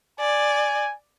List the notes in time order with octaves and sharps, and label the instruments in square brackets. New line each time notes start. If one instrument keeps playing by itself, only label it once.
[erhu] D5 [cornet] G#5